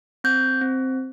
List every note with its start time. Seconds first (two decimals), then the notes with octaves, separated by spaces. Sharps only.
0.24 C4 G6
0.61 C4